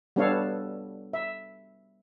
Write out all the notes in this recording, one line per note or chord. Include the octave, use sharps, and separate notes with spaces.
G3 B3 D4 A4 C#5 F5
E5